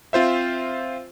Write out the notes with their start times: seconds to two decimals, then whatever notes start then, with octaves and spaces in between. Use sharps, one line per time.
0.13 C4 F4 C5 E5